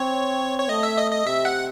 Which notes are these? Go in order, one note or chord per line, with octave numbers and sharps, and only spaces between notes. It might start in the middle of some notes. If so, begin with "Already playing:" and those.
Already playing: C4 C#5
C#5
A3 D#5
E5
D#5
D#5
C3 E5
F#5